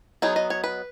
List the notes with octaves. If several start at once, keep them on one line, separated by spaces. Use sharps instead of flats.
F#3 B3 D#4 G#4
D#5
C#5
B4